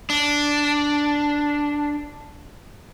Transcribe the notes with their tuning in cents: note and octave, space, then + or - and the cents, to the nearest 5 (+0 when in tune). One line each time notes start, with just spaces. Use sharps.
D4 -5